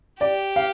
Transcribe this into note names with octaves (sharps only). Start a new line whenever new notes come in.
G4 D5
F5